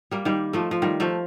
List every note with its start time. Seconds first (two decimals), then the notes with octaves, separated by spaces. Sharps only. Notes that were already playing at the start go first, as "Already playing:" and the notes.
0.11 G3 A#3
0.25 D#3 G3
0.53 F3 A3
0.71 F3
0.82 D#3 G3
1.00 F3 A3